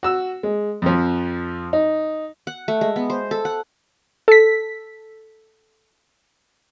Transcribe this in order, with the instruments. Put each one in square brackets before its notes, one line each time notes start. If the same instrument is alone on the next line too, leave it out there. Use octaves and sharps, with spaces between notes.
[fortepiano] F#4 E6
G#3
F2 F3
D#4
[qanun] F#5
A3
G#3
B3
C5
A4
F#5
[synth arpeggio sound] A4 B6